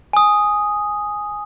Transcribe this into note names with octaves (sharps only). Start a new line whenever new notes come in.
G#5 D#6